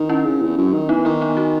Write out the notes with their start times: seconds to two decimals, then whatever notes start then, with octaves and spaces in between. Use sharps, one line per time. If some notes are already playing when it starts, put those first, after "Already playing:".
Already playing: D#3
0.09 C#4 E4
0.25 C#3
0.41 E2
0.57 F#2
0.73 D#3
0.89 E3 B3 D#4
1.05 D#3 B3 D#4
1.21 B3 D#4
1.37 D#4 F#4